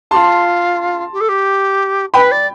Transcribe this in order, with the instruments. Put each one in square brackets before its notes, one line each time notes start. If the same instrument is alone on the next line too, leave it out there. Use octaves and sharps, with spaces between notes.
[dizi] F4 G4 [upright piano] A5 C6
[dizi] G4
A4
G4
[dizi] B4 [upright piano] G5 B5
[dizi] D5